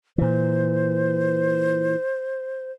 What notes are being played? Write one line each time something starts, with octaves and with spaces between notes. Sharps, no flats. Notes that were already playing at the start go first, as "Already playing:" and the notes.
A#2 E3 C5